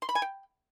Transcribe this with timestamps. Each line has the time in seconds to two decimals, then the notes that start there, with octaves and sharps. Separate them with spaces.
0.02 C6
0.09 B5
0.15 G#5
0.22 G5